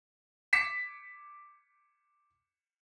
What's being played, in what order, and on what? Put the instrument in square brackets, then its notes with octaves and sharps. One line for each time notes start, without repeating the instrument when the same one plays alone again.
[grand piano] D6 B6 C#7 E7